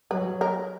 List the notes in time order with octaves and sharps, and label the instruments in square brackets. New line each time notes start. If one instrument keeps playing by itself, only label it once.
[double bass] F#3 [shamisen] B4
[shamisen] A#4